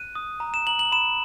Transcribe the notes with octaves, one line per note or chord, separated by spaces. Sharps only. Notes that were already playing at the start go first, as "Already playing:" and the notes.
Already playing: F#6 D#7
D#6
A#5
E7
A#5 F#7
F#7
B5 E7